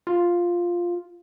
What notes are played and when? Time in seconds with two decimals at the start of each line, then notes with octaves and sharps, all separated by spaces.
0.07 F4